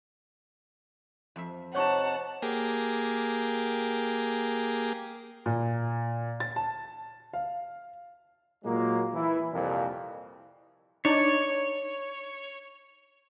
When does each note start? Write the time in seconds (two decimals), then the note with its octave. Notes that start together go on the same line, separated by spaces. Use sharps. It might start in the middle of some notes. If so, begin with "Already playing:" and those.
1.36 F2 E5
1.75 C3 D#4 G4 C#5 F#5 A5 C#6
2.42 A#3 G4 G#4
5.46 A#2
6.40 A6
6.56 A5
7.33 F5
8.64 A#2 F#3 G#3 A#3
9.14 E3 E4
9.52 C2 F2 A#2
11.05 D4 D#4 C#5 D5